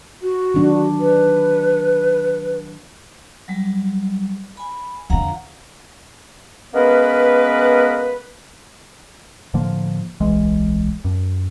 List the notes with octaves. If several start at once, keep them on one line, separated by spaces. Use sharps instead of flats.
F#4
D#3 F#3 D4
B4
F#3 G3
G#5 B5
F2 D3 F5 F#5 A#5
G#3 A#3 B3 C#4 A#4 B4
A2 D3 F3 A#3
D1 B1 E3 G#3
F#2